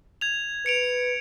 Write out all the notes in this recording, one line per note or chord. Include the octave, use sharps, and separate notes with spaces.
G#6 F7
B4 C#7 D7 F7